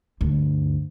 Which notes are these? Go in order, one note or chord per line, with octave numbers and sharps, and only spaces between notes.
D2 G2